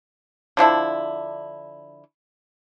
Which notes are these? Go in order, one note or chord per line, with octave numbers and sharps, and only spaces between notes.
D3 F3 D4 E4